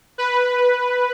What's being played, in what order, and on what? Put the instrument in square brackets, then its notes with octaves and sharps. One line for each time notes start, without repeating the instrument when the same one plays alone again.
[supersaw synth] B4